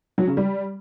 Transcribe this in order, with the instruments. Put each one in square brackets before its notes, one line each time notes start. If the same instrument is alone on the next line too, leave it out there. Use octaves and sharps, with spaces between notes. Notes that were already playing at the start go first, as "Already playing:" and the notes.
[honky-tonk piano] F#3
C#3
G3